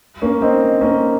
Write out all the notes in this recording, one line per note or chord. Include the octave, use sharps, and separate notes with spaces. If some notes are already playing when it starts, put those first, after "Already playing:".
A#3 C#4
C4 D#4
A#3 C#4